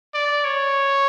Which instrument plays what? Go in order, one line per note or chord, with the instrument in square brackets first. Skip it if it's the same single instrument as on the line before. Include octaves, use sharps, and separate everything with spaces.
[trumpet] D5
C#5